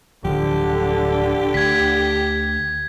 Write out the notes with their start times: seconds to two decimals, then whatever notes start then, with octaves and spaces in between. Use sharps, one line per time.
0.25 D1 D3 F3 G4
1.54 D2 G#6 B6